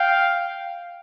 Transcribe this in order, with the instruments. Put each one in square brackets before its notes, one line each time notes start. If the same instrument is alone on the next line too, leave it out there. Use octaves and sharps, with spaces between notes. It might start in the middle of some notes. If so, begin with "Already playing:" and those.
Already playing: [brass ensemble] F5 G5